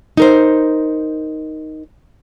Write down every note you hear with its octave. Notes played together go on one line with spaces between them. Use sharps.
D#4 A#4 C5